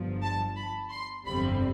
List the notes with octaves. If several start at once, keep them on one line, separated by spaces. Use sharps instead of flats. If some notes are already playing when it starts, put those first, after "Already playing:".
Already playing: G1 G2 F3
A5
B5
C6
G1 F2 C3 G3 C4 B5